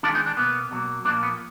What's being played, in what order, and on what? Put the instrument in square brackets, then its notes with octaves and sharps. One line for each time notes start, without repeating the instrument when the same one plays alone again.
[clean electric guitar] D#3 G#3 B3 D4 F4
B3 D#4
D4
B2 A#3 B3
B2 F#3 A#3
A#2 F3 A#3 D4
B3